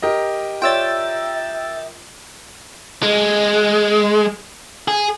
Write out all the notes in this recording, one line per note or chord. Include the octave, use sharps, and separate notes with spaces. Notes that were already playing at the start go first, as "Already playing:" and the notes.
G4 A#4 D#5
F4 C#5 D5 E5 G5 E6 A6
G#3
G#4